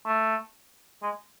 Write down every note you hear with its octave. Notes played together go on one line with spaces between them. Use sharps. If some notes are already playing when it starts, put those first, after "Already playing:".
A3
G#3